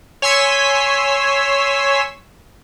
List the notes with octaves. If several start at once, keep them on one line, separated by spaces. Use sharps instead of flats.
C#5 G#5 C6 E6 B6